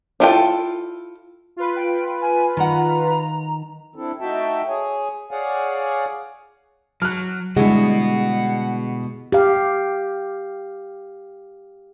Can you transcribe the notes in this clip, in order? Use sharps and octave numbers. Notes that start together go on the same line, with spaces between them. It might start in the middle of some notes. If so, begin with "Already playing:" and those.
D4 E4 F4 A4 G5
F4 B4
G5
G#5
D#3 F#5 A#5
C4 D4 E4 A4
A3 D#4 F#4 E5 G5 A5
G#4 C#5 G#5
G#4 C#5 D5 F5 F#5 G#5
F#3 F6 F#6
B2 D3 G3 G#3 E4 F#4 F#5
G4 F5